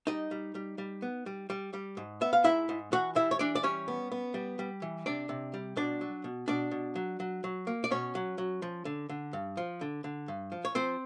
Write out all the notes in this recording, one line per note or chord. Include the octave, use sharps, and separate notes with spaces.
G3 D#4 D#5
G3
G3
G3
B3
G3
G3
G3
G#2
B3 E5
F5
G#2 E4 E5
G#2
E3 F#4 F#5
G3 E4 E5
C#5
E3 D4 D5
D5
G3 C#4 C#5
B3
B3
G3
G3
E3
C3 D4 D5
C3
G3
B2 D4 D5
F#3
B2
B2 D4 D5
B2
F#3
F#3
F#3
A#3
D5
B2 C#4 C#5
F#3
F#3
F3
D3
D3
G2
F3
D3
D3
G2
F3
C#5
F3 C4 C5